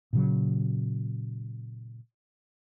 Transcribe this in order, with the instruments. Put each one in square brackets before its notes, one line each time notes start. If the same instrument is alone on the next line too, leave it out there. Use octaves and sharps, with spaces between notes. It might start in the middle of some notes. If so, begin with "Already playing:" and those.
[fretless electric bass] A#2 C#3 F#3